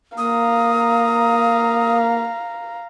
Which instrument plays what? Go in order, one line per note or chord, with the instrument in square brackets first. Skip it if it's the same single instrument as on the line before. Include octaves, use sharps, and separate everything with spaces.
[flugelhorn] A#3 [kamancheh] F5 A#5 [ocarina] D#6